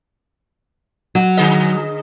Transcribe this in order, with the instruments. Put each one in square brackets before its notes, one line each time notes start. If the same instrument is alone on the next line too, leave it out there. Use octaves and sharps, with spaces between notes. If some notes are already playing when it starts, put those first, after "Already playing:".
[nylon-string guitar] F#3
[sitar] D3 G#4 D#5